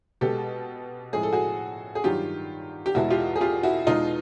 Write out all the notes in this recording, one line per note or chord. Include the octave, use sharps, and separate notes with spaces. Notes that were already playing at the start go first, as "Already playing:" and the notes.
B2 G#3 G4 A4
A2 F3 G#3 G#4
A4
F#4 G#4
G#4
G2 D#3 F#3 F4 G4
G4
E2 B2 G#3 E4 F#4
F4 G4
G#4
F4 G4
E4 F#4
E2 B2 G#3 D#4 F4